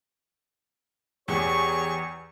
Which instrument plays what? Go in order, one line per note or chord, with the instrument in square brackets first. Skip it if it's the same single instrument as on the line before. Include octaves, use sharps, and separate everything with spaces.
[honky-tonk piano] E2 [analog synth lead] G4 [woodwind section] G#4 C#5 [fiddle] C#6